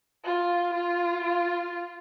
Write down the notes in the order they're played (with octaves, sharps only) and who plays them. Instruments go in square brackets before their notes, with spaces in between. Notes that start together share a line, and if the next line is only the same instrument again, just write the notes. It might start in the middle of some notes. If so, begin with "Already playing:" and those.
[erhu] F4
F4
F4